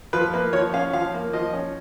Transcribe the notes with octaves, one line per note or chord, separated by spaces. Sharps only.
F3 B4
A#3 B4
F3 C#5
C#4 F5
F3 F5
A#3
F3 D#5
C#4